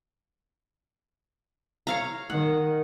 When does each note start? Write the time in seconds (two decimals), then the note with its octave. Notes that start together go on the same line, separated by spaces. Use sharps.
1.87 C#5 F5 A#5
2.30 D#3 F#5